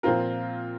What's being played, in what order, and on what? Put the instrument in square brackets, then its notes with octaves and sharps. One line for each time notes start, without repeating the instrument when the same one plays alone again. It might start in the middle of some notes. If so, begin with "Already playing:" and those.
[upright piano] A#2 F3 C4 F4 A#4